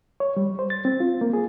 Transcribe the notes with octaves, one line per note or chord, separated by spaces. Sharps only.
C#5
G3
C5
A6
C4
F4
A#3
G#4